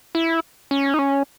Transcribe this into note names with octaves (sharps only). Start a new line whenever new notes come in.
E4
C#4
D#4
C#4